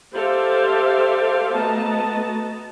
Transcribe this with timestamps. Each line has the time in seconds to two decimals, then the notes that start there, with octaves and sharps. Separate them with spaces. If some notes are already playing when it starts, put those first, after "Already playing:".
0.14 G4 A4 C5 D5 E5 F5
1.54 A3 B3 F#4 D#5 A5 A#5